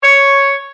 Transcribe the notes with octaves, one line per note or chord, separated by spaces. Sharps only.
C#5